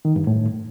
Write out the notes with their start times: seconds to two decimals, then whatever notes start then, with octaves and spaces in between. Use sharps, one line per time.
0.05 D#3
0.16 G2
0.27 A2